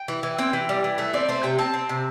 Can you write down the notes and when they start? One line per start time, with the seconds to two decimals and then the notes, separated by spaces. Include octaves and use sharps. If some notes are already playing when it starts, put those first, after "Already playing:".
Already playing: G5
0.08 E3
0.23 E3
0.38 C4 G5
0.53 E3
0.69 G3
0.84 E3
0.98 A3 E5
1.14 C4 D5
1.29 A3 C5
1.43 C3 G5
1.59 C4 A5
1.74 C4
1.89 C3